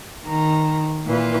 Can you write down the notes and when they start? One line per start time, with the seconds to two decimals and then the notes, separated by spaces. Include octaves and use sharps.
0.24 D#3 A#5
1.05 A#2 E3 F4